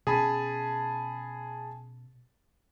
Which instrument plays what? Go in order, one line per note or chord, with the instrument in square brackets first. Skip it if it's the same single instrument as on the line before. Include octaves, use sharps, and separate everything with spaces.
[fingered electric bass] B2 C4 C#4 [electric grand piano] G#4 A5 B5